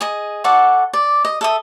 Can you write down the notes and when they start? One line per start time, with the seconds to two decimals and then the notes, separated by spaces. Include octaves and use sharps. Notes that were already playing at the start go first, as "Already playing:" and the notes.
0.01 G#4 D#5
0.44 F#4 A4 D5 F#5
0.93 D5
1.25 D#5
1.41 A4 E5 D#6